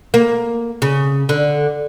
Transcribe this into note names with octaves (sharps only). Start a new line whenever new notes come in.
A#3
C#3
D3